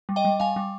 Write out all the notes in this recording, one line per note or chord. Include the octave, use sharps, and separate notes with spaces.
G3
D#5 G5
G3
G3 F5 G#5
G3